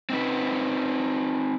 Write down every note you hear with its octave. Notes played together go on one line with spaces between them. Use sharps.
C4 D#4 B4